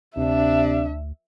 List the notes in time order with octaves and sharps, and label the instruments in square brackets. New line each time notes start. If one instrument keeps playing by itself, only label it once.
[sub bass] D2 [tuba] C3 [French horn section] D4 [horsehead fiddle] E5